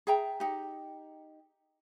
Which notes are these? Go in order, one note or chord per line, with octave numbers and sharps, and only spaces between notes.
G#4 E5 G5 A#5
D#4 G4